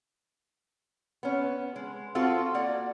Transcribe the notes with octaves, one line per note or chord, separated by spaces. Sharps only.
B3 C#4
G#3
C4 F4 F#4 A4
A#3 D5 F#5